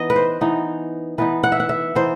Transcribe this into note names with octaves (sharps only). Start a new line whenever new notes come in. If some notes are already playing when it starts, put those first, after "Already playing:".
Already playing: E3 B3 D#4 D#5
B4
C5
E3 B3 D#4
E3 B3 D#4 B4
F#5
E5
F#5
E5
E3 B3 D#4 C5